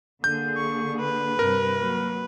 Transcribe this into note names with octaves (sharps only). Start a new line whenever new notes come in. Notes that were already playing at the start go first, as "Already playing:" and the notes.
D3 A#3 G#4 G6
C#6
B4
G2 C3 A#4
F#3 A#3